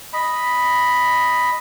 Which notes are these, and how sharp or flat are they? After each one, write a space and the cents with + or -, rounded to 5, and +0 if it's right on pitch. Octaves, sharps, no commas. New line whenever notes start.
D#5 +0 B5 +0